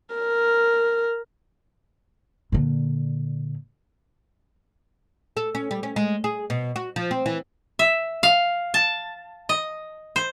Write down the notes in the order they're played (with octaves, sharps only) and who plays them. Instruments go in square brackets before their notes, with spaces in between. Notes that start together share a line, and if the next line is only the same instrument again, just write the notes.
[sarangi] A#4
[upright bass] A#2 D3
[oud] A4
C#4
G3
C#4
G#3
G#4
B2
F#4
F3
C4
E3
[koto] E5
F5
A5
D#5
C5